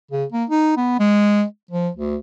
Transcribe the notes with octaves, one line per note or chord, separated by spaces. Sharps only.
C#3
A#3
D#4
B3
G#3
F3
D2